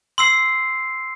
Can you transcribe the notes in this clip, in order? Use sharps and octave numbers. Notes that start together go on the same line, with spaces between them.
C6 E6 C7